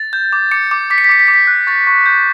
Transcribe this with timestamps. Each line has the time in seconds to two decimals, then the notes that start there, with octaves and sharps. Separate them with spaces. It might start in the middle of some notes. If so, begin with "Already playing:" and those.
Already playing: A6
0.13 G6
0.33 D6
0.51 D6 C#7
0.71 D6
0.90 D6 B6
0.98 C#7
1.04 B6
1.09 D6 C#7
1.19 B6
1.27 D6 C#7
1.34 B6
1.47 F#6
1.67 C#6 A6
1.87 C#6
2.06 G6